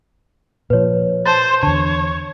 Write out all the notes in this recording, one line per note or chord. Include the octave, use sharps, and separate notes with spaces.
A#2 F3 B4 C#5
C5 A5 A6
E2 D3 C#5 A5